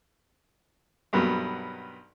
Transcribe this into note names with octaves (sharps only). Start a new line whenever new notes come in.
B1 G2 F#3 A#3 B3